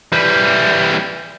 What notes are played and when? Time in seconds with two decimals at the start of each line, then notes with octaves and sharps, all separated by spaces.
0.12 E3 G3